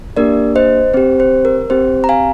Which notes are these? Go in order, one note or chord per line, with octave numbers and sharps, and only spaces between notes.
A#3 D4 G4 A#4 D5
C5 D#5
C4 G4 C5
C5
A#4
C4 G4 C5
A#5
F5 G#5